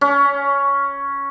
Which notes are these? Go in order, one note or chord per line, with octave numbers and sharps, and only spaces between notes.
C#4